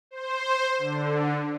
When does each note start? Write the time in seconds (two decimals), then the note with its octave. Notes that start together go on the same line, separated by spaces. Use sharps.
0.11 C5
0.78 D3